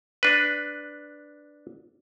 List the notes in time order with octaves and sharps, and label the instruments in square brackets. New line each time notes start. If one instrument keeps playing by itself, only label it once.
[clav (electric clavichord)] D4 B4